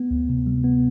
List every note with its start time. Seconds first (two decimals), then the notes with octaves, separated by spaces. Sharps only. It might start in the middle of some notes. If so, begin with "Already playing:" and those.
Already playing: B3
0.11 D2
0.29 C3
0.47 G3
0.64 B3